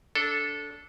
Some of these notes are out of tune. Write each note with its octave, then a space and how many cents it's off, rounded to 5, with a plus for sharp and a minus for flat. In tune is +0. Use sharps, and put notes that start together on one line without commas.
D4 -15 A4 +0